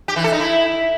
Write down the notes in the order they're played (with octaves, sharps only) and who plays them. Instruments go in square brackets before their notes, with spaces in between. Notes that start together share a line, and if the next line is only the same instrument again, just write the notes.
[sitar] G4
E3
A4
D#4
E4